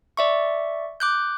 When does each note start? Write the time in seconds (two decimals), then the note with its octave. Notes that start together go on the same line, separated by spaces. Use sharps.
0.17 D5 E5 C#6
1.00 D6 F#6 G6